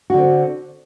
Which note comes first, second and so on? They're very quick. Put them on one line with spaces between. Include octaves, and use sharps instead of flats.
F#4 D3 C4